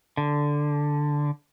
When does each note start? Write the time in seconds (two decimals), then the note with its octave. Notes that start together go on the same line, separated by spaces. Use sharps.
0.17 D3